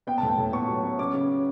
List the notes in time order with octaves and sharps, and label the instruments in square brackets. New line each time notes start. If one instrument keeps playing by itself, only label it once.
[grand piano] B3 G5
A5
A2
G5
A2
B3 C#6
F#3
B3
C#4 D6
C#3